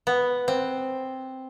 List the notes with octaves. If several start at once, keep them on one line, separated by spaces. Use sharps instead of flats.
B3
C4